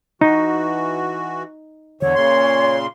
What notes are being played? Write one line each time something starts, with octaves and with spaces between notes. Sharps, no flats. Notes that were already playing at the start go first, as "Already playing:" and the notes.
E3 D#4 F#4
E2 D3 C#5
A#2 C#3 C6